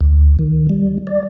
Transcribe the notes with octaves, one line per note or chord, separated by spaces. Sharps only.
D2
D#3
G3
D5